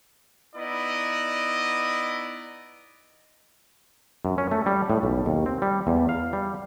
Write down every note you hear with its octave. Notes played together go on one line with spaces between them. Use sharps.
B3 D#4 E4 D5 D#5
F#2
C#4
A3
G3
A2
B1
D#2
C4
G3
E2
F5
G3